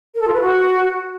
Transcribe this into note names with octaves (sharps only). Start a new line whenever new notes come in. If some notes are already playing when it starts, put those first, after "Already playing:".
A#4
A4
F4
B4
F#4